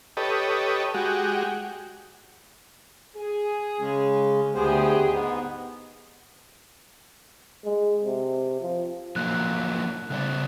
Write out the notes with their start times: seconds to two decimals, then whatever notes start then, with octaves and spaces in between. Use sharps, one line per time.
0.17 G4 A4 B4 C#5 D#5
0.94 G#3 F#4 G4
3.16 G#4
3.80 C#3 G#3 C#4
4.55 D2 B3 G4 G#4 C5
5.11 G#2 B3
7.64 G#3
8.04 C3
8.61 F3
9.16 F3 F#3 A#3 F#6
10.10 C#3 G3 D5 F#6